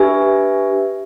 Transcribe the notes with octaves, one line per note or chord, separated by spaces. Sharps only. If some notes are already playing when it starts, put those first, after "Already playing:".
Already playing: D4 G4 B4 E5 G#5